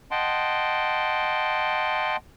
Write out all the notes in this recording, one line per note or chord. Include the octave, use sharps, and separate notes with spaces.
D#5 F#5 G5 A5 C6